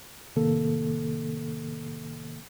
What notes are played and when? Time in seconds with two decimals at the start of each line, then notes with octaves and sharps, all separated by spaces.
0.36 C2 A2 C3 D#3 A#3 A4